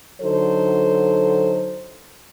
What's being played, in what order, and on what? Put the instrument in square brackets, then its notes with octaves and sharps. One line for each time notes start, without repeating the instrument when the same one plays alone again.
[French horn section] D3 F#3 D#4 A4 C5